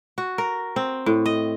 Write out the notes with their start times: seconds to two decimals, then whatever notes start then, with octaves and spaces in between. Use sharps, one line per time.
0.18 F#4
0.38 A#4
0.76 C4
1.06 A2
1.26 D#5